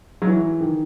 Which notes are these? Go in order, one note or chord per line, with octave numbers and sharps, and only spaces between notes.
F#3
E3
D#3